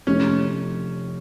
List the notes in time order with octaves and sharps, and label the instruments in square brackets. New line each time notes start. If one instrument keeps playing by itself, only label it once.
[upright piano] F1 [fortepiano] C#4